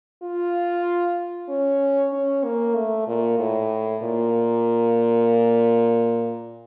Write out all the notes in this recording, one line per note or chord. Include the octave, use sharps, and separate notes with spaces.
F4
C#4
C#4
A#3
A3
A#2
A2
A#2